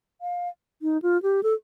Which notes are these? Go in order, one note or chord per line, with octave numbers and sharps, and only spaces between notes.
F5
D#4
F4
G4
A4